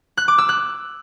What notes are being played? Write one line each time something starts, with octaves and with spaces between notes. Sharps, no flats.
F#6
D6
E6
F#6